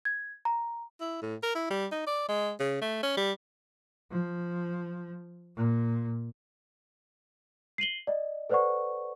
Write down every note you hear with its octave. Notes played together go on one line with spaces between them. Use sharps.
G#6
A#5
E4
A2
A#4
E4
G3
D#4
D5
G#3
C#3
A3
C#4
G3
F3
A#2
C7 D#7 F#7 G7
D5 D#5
A4 B4 C5 D5 F#5 C#6